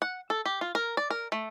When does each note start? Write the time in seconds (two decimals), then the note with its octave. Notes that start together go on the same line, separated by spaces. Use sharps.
0.02 F#5
0.30 A4
0.46 G4
0.61 F4
0.75 A#4
0.97 D5
1.10 A#4
1.32 A3